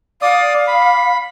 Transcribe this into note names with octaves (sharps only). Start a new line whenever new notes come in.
D5 F5 D#6
B5